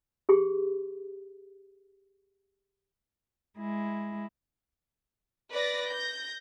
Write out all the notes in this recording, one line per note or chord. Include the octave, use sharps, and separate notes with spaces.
G4 G#4 C6
G#3 E4
B4 D5 A6 A#6
G6 A#6